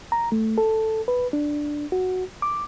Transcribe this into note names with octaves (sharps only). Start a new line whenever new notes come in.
A#5
A3
A4
B4
D4
F#4
D6